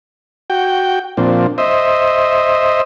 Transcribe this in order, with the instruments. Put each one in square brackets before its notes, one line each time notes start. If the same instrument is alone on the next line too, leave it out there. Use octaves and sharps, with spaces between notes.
[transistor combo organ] F#4 G5
A#2 F3 C4 D4
C5 D#5 E5